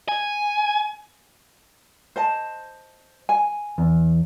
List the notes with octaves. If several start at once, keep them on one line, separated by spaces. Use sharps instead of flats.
G#5
C5 D#5 A5
G#5
E2